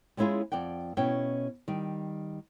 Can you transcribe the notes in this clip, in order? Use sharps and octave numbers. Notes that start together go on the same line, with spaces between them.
G3 G#3 C#4 E4 F4 G#4
F2 D5 F#5 G5
B2 C#4 E4 G5
D#3 G3